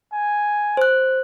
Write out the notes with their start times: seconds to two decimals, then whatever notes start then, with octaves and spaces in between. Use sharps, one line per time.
0.13 G#5
0.77 C5 F#6